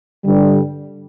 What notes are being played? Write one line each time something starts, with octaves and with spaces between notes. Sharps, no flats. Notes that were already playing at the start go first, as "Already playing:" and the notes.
G2 D3 G3